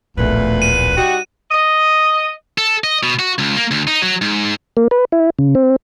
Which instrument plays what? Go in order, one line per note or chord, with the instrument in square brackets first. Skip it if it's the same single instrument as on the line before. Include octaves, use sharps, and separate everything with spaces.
[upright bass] D1 A#1 [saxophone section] E2 A#2 B4 [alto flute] A3
[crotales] D#7
[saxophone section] G3 D#4 F#4 [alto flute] G5
[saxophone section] D#5
[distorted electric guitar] A4
D#5
B2
F#4
C#2
A#3
D2
D#4
F#3
G#2
[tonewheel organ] A#3
B4
E4
C#3
C4